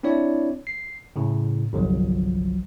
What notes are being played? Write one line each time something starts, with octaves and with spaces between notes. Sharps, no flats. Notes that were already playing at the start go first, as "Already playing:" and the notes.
C4 D4 E4 C#5 D5
C7
A2 C#3
G1 C2 F3 F#3